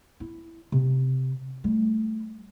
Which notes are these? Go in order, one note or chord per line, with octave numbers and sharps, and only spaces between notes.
E4
C3
G3 A3